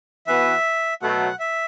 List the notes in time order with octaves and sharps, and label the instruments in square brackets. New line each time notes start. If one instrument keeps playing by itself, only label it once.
[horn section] E3 B3 F#4 B4 [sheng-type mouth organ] E5
[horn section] B2 F#3 A3 [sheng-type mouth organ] F#5
[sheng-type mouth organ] E5